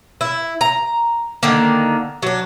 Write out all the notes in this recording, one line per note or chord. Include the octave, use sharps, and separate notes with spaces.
E4
A#5
D3 D#3 A#3
F#3 D4